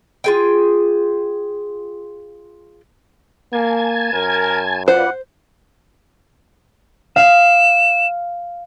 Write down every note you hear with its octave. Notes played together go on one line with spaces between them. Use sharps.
F4 G#4 G5
A#3 G#5 A5 G#6
F#2 A#4
F4 B4 C5 D5 F#5
F5 E7